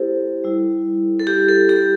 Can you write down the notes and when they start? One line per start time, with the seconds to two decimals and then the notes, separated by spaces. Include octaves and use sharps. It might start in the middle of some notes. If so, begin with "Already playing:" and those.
Already playing: A3 E4 G4 A4 C5
0.44 G3 E4
1.19 A4
1.27 G4
1.49 A4
1.69 G4